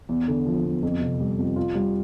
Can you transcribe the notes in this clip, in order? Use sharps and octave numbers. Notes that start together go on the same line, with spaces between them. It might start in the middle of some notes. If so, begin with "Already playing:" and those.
E2
D3
F3
E2
F2
C3
G3
F2
F4
G3